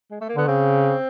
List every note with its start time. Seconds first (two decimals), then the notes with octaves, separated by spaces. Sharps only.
0.11 G#3
0.21 A3
0.29 A#3
0.37 D3 B3
0.47 C#3 C4